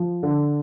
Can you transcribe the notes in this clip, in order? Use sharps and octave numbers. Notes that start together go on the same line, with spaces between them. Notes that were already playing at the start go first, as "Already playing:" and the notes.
Already playing: F3
D3